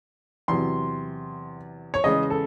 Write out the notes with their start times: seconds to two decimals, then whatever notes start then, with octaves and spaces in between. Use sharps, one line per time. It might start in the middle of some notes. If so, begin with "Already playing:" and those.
0.48 E2 C3 F#3 C6
1.94 C#5
2.04 E2 C#3 G#3 D#5
2.30 A4